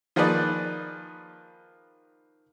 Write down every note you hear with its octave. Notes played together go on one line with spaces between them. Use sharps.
D#3 F3 A#3 G#4 B4 D5